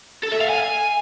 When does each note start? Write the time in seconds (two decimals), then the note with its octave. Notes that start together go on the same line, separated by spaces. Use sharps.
0.23 A4
0.32 E5
0.41 F5
0.49 G#5